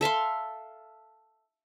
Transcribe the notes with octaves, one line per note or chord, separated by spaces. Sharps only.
A4 E5 F5 C6